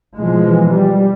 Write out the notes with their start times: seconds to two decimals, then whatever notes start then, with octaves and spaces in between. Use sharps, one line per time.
0.18 B2 E3 F3 G#3
0.68 G3